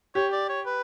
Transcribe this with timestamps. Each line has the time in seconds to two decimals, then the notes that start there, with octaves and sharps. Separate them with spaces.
0.15 G4 C#5
0.32 D5
0.49 C#5
0.66 B4